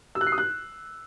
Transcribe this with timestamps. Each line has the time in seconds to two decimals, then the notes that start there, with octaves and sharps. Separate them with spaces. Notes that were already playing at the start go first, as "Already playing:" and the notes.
0.15 E6
0.21 F#6
0.27 C7
0.32 D#6
0.38 F#6